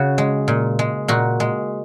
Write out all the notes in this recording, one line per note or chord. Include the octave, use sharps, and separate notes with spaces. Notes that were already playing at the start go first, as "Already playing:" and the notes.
Already playing: C#3 F#4
G#3
A#2
G#3
A#2 F#4
G#3